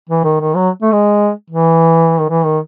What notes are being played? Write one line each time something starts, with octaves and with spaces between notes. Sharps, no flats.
E3
D#3
D#3
F#3
A3
G#3
E3
D#3
E3
D#3